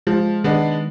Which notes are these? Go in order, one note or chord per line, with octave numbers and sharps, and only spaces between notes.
F3 G#3
D#3 G#3 B3 D4